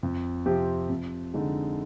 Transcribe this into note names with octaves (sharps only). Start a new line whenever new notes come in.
F2
C3 F3 C4 G4
F2
D3 G#3 D#4